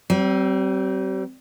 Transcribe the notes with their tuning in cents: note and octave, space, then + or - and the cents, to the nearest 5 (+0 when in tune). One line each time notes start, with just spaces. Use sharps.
G3 -40 C4 +0